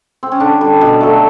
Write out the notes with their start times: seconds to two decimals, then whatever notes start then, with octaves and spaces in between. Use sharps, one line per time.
0.23 C4
0.32 C#4
0.40 D3 D4
0.61 G3
0.81 B2
1.01 F#3 A3